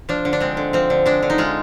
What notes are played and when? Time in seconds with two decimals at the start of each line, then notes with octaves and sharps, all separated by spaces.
0.09 F3 D4
0.25 D3
0.33 D4
0.40 G#3 C4
0.57 D3
0.73 F3 C4
0.90 D3
1.06 G#3 D4
1.23 D3
1.30 D#4
1.38 G#3 F4